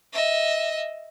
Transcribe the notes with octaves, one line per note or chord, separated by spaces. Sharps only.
D#5 E5